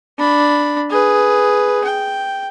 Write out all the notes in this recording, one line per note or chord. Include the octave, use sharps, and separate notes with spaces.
D4 B5
G#4 B4
G5